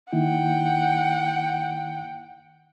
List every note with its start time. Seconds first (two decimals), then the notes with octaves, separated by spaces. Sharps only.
0.13 D#3 A#3 E4 F#5 G5